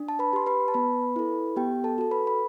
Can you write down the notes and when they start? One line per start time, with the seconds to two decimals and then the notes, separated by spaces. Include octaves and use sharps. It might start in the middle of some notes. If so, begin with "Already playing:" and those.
Already playing: D4
0.08 A5
0.19 B4 B5
0.33 G4 C6
0.46 B4 B5
0.68 A5
0.74 B3 B4 B5
1.16 E4 A4
1.56 B3 G4 G5
1.84 A4 A5
1.98 F#4 A4
2.11 B4 B5
2.27 B5